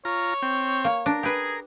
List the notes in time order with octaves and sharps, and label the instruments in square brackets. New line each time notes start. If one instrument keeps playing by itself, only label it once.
[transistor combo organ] F4 A#5 [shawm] C#5
[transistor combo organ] C4 G5
[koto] A#3
[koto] D4 [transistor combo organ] A#4
[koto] G4 B4 [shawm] G#4